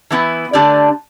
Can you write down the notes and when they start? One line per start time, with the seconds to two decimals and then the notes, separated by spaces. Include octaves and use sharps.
0.10 E3 B3 E4
0.53 D3 A3 D4 G4 D5